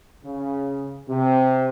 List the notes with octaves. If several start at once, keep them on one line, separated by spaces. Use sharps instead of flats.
C#3
C3